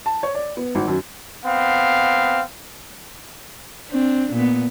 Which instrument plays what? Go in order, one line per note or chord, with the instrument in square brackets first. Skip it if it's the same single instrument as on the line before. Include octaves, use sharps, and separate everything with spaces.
[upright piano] A5
C#5
D5
B3
G#1
F#2
[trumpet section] B3 C4 F5
[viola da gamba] C4 D4
A#2 B3